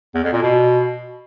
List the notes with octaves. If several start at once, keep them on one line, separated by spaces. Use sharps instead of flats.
E2
F2
A#2
B2